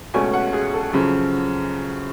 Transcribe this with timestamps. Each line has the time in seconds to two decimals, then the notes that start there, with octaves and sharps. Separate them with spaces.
0.14 C#2 B2 A3 C#4 G#5
0.34 F#5
0.53 G#4
0.74 A4
0.93 F#2 C#3 F3